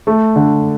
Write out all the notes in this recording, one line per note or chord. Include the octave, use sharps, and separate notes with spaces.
A3
D3